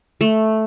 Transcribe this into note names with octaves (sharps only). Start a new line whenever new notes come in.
A3